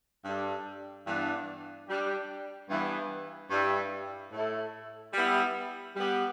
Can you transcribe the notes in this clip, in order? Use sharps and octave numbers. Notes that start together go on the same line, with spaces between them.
G2 G3 D4 A4
G2 E3 B3 D4
G3 D4 G4
G2 E3 B3
G2 G3 E4
A2 A3 E4 A4
G3 B3 E4
G3 B3 G4